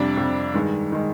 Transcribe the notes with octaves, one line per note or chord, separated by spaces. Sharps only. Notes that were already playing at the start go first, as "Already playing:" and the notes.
Already playing: F2 C3 G3 D4 D5
F2 C3 G3
G2 D#3 G#3
D#3 G#3